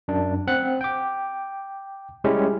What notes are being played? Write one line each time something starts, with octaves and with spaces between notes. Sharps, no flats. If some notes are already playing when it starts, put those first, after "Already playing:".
F#2 D4
C4 F#5 F#6
G5 D6
G3 G#3 C#4 E4 G4